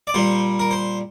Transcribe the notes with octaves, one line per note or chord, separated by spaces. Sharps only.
D5
A#2 G3 C5
A#4
C5